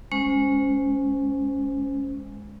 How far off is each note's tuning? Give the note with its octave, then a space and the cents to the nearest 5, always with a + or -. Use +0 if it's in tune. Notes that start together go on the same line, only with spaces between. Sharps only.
G#3 +0 C#4 +0 C5 -15